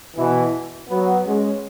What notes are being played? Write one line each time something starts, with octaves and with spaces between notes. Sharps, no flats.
B2 E3
F#3 B3
G#3 C#4